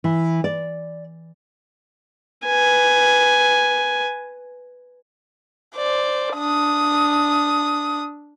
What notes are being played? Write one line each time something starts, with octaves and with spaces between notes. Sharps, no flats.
E3
D5
B4 G#5
C5 D5
D4 D#6